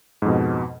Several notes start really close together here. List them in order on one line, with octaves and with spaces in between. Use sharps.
G#2 F2 B2